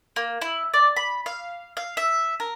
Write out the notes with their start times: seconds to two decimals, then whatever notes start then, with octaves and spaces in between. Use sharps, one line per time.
0.16 A#3
0.42 E4
0.74 D5
0.97 B5
1.26 F5
1.77 F5
1.97 E5
2.40 A#4